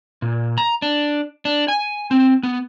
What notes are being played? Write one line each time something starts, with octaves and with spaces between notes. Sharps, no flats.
A#2
A#5
D4
D4
G#5
C4
B3